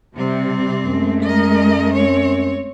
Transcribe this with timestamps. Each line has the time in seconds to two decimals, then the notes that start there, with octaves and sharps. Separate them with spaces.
0.15 C3 G3 C4
0.83 F#2 G#3 A3
1.23 A#4 D#5
1.94 C4 C#5